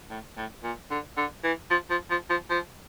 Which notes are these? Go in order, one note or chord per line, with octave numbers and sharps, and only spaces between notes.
A2
A2
A#2
D3
D3
E3
F3
F3
F3
F3
F3